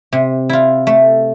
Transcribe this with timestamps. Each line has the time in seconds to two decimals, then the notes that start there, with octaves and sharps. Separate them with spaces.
0.13 C3
0.49 E4 F4
0.87 A3